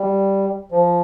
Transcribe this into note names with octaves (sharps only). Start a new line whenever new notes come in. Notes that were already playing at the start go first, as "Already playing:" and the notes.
Already playing: G3
F3